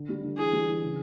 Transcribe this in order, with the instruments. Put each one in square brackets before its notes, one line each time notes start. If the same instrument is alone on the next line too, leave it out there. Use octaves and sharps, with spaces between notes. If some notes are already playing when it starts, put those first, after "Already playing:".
Already playing: [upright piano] D3
G3
D3
[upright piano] E3 [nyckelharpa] G#4
[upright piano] G3
E3
C#3